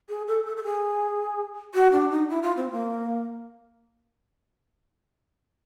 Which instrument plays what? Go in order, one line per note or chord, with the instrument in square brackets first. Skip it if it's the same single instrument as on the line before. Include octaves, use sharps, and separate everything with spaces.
[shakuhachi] G#4
A4
A4
A4
G#4
F#4
D4
D#4
E4
F4
C4
A#3